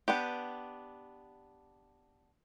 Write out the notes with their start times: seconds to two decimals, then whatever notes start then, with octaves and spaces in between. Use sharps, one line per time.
0.08 B3 D4 G4